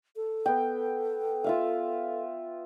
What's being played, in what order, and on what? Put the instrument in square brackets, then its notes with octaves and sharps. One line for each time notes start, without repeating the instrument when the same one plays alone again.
[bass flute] A4
[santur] B3 G5
F4 E5 F5